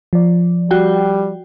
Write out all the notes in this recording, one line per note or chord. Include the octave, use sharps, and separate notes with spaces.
F3 D5
G3 F#4 G5